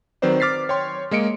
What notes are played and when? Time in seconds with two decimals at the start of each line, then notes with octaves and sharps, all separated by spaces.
0.22 D#3 F#3 C4 B4 C5 D5
0.40 D6 F6 A6 B6 C7
0.69 C#5 G5 C6
1.11 G#3 A#3 D#5 C#7 D7